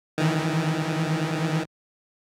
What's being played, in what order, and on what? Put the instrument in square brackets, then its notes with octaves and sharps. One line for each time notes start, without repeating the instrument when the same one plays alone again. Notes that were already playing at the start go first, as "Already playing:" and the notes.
[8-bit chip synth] D#3 E3